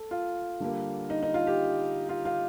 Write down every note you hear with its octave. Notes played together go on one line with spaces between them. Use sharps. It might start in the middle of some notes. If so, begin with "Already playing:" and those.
Already playing: A4
F4
D3 G3 A#3
D#4
D#4
F4
G4
F4
F4